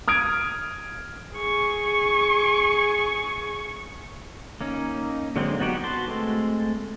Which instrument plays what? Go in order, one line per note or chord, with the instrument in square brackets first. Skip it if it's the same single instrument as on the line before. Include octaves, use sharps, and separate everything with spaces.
[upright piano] D#6 F6 G#6 D7
[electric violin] G#4 C#6
[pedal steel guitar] A#3 C#4 D#4
D3 F#3 G#3 A#3 C4
F#3 B3 D#4 F#4 G4
F#4 B4 A5 C6
G#3 A3 C4 A4